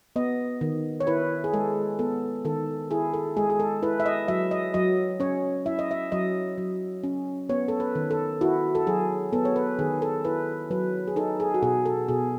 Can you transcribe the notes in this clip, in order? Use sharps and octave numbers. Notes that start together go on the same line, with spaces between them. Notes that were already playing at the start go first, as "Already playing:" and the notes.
B3 D#5
D#3
C#5
E4 B4
G#4
G#3 A4
B3 A4
D#3 A4
E4 G#4
A4
G#3 G#4
G#4
A4
E4 B4
E5
D#5
F#3 E5
D#5
F#3 D#5
C#4 C#5
E4 E5
D#5
E5
F#3 D#5
F#3
C#4
B3 C#5
A4
B4
D#3
A4
E4 F#4
A4
F#3 G#4
B3 A4
C#5
B4
D#3 G#4
A4
E4 B4
F#3 B4
G#4
D#4 A4
G#4
F#4
B2 G#4
A4
B2 G#4